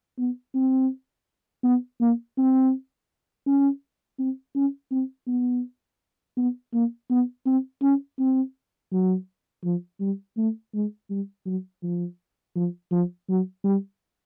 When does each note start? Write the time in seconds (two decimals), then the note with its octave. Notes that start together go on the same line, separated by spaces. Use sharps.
0.18 B3
0.55 C4
1.64 B3
2.01 A#3
2.38 C4
3.47 C#4
4.19 C4
4.56 C#4
4.91 C4
5.28 B3
6.37 B3
6.74 A#3
7.10 B3
7.46 C4
7.82 C#4
8.19 C4
8.92 F#3
9.64 F3
10.00 G3
10.38 A3
10.74 G#3
11.10 G3
11.46 F#3
11.83 F3
12.56 F3
12.91 F3
13.29 F#3
13.64 G3